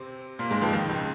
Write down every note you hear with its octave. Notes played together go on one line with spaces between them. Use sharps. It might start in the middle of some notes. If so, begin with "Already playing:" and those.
Already playing: C3 C4
A#2 A#3
G#2 G#3
F2 F3
D#2 D#3
C#2 C#3